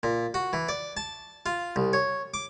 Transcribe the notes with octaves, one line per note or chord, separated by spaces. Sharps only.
A#2
F#4
E3
D5
A5
F4
C2
C#5
D6